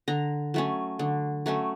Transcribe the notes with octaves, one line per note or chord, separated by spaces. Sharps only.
D3 A#5
F#3 A3 C#4
D3
F#3 A3 C#4